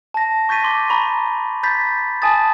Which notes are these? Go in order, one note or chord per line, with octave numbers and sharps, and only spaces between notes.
A5 A#6
C#6 G6 A6 B6 D#7
C6 D6 G7
A#5 B5 C#6
B5 G6 A6 B6
G#5 A5 D#6 A6